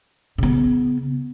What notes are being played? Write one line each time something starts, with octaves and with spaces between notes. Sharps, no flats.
C#3 B3